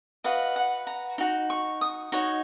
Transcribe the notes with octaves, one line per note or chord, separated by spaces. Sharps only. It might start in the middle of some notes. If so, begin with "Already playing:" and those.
F#4 B4 D#5 F5
F#5
A#5
D#4 F#4
C#6
D#6
D#4 F#4 C#5